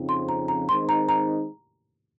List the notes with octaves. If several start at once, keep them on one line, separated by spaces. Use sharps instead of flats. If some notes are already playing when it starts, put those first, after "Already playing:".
Already playing: F2 C#3 F3 C4 D#4
C6
A#5
A#5
D#3 G#3 C4 D#4 C6
A#5
A#5